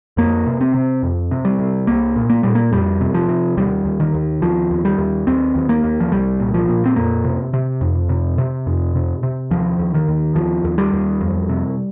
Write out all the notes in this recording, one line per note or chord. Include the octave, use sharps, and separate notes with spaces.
F2 A#3
C3
C4
C3
F2
C3
G3
C3
C2 A#3
A#2
A#3
A#2 G3
A#3
F2 G3
C3
F3
C3
D#2 G3
D#2
D#3
D#2
D#2 F3
D#2
G3
D#2
D#2 C4
D#2
A#3
D#2
F3
C2 G3
A#2
F3
A#2
C4
F2 A#3
C3
C3
F2
C3
C3
F2
C3
C3
D#2 F3
D#2
D#3
D#2
D#2 F3
D#2
G3
D#2
F2
C3